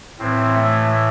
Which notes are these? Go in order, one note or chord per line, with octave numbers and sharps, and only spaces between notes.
A2 E3 C4
A3